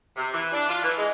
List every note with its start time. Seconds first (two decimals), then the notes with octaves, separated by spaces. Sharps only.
0.16 C3
0.33 E3
0.53 D4
0.68 F4
0.82 E3
0.97 G#3